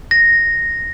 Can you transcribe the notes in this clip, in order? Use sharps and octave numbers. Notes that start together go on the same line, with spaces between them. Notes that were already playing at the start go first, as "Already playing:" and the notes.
A#6